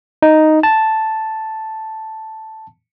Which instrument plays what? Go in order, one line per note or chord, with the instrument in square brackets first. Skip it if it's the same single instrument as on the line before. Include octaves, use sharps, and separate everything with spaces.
[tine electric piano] D#4
A5